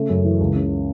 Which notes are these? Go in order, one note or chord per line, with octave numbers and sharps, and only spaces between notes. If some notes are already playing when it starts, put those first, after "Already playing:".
Already playing: C#3 A3
F#2
E3
C#2
C#3